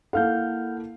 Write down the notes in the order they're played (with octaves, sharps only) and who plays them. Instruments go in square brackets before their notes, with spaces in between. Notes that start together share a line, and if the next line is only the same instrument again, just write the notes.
[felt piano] A#3 E4 A4 [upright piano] F5 [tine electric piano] F#5 F6 G6